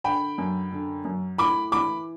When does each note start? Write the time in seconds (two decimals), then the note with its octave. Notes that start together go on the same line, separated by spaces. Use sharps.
0.04 D3 G5 B5
0.38 F#2
0.72 D3
1.05 F#2
1.38 A2 B5 D6
1.72 E3 B5 D6